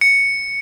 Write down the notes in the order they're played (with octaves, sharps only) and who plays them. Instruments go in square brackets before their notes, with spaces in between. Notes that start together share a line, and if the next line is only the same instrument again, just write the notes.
[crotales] C#7